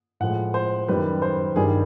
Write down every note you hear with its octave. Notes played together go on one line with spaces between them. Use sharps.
A2 F3 G#3 F#5
C5
F#2 D#3 G3 B4
C5
G2 D#3 G3 G#4